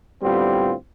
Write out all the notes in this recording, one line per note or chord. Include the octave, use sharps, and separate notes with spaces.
A2 D3 G3 B3 C4 F4